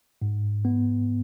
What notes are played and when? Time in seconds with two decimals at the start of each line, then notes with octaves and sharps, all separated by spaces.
0.22 G#2
0.65 B3